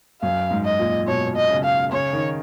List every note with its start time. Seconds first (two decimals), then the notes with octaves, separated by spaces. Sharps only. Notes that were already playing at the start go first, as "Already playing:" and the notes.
0.22 F#2 F5
0.51 G#2
0.64 D#5
0.79 A#2
1.07 B2 C#5
1.36 D#5
1.50 C#3
1.64 F5
1.92 C#3 C#5
2.13 D#3